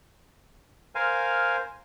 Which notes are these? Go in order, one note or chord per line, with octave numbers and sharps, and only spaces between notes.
A#4 C5 F5 G#5